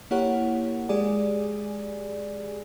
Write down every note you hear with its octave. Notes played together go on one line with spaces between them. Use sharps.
A#3 E4 G4 A#4 C#5 F#5
G#3 G4 G#4 D5 G#5